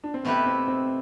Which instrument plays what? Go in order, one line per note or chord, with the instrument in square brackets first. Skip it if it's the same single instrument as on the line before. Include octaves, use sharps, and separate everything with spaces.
[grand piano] D4
C4
[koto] B2 A3 E4 G4 B4 [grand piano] B3
[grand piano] C4
C4